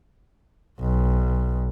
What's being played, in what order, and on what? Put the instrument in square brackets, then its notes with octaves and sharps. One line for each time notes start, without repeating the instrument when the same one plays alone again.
[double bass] B1